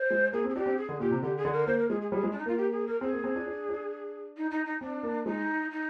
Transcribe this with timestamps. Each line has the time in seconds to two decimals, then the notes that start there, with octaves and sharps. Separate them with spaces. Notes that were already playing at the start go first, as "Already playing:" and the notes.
Already playing: C5
0.10 G#3
0.33 A#3 G#4
0.44 C4
0.49 G#4
0.55 D4 G4
0.66 C4
0.77 G#4
0.89 D3
1.00 A#2 G4
1.11 C3
1.23 D3 G4
1.37 G#4
1.45 D3
1.53 A#4
1.67 A#3 C5
1.79 A#4
1.89 G#3 G#4
2.01 G#4
2.12 G3 G#4
2.23 G#3
2.31 D4
2.39 D#4
2.46 A#3 F4
2.57 G4
2.72 G#4
2.87 A#4
3.01 C4 G#4
3.13 A#3
3.24 C4
3.35 D4
3.46 D4
3.69 D4
4.37 D#4
4.51 D#4
4.66 D#4
4.81 C4 D4
5.03 A#3
5.26 G#3 D#4
5.71 D#4